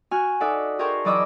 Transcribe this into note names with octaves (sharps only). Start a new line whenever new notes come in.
F#4 G#5 F6
D#4 A4 D5 E5 F#5
G#4 A#4 C5 G5 A5 C#6
E3 F#3 D5 D#5 D6 E6